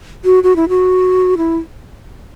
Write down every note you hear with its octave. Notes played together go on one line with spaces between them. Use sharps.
F#4
F#4
E4
F#4
E4